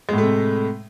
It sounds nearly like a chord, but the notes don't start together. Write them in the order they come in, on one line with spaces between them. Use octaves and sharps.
G#3 A2 A3 C3